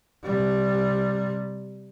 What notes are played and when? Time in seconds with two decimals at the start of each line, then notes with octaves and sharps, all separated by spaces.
0.23 C3 G3